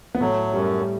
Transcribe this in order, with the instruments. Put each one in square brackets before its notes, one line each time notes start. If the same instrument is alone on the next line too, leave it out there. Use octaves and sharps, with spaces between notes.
[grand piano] B3
[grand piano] A2 A3 [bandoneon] F#3
[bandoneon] F#2 [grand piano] G3